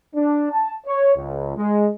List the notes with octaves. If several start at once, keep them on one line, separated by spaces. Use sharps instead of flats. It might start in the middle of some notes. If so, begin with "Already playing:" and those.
D4
A5
C#5
C#2
G#3